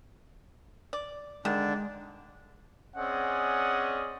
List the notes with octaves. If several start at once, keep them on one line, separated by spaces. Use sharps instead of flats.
D5
D3 D#3 G#3 D4
C4 C#4 G#4 D5 D#5 F#5